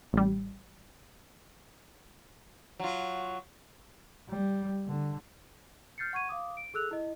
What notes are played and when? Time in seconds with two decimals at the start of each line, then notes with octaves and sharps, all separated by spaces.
0.13 A1 G3
2.80 F#3 F4
4.29 G3
4.87 D3
5.98 F6 G6 A6 C7 C#7
6.13 F#5 C#6 G#6 D#7
6.29 F5 D6 D#6
6.57 D7
6.74 G#4 A4 E6 F#6 F7
6.91 E4 D#5